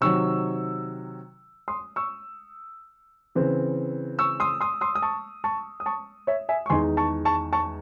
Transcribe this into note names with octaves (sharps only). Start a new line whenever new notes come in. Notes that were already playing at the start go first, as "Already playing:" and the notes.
C3 D#3 F#3 C#6 E6
C6 D#6
C#6 E6
C#3 E3 C4
C#6 E6
C6 D#6
C6 D#6
C6 D#6
D#6
A5 C#6
A5 C#6
D#6
A5 C#6
C#5 E5
E5 G#5
C#6
E2 D#3 G#3 D#4 G#5 C6
A5 C#6
A5 C#6
A5 C#6